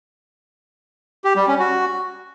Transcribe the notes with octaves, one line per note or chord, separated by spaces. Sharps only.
G4
G3
C#4
F#4